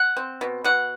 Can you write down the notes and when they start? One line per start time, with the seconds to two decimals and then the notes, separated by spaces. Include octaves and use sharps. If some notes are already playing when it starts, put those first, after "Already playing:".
Already playing: F#5
0.17 C4
0.41 B2
0.64 B2 F#5